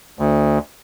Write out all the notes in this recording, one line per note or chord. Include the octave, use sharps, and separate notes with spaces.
D2